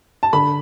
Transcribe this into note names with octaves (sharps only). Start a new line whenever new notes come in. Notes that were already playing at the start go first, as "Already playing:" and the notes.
A5
D3 B5